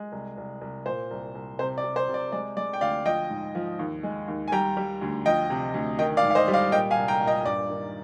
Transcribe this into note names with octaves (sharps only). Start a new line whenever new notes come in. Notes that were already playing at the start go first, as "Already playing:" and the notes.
Already playing: G#3
C2
C2
C2
A#2 C5
C2
C2
C3 C5
D5
C3
C5
C3
D5
G#3 D5
G#3 D5
G5
D2 D5 F5
F3 D#5 G5
G#2
F3
D#2
G#3
D#2
G#5
G3 G5 A#5
G3
D2
F3 D#5 G5
C3
D2
D#3 D#5 G5
D5 F5
G#2
F5
C5 D#5
G3
D5 F5
A#2 D#5 G5
F5 G#5
C2
G5 A#5
A#2
D#5 G5
G2 D5
D#3